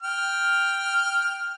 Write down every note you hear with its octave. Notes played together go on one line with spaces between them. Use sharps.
G5 F6